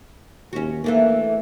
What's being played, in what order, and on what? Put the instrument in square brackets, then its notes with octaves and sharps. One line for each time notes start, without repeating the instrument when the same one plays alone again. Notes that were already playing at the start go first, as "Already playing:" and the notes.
[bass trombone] D#2 [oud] C#4 F#4
[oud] E3 A3 D4 [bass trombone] A#3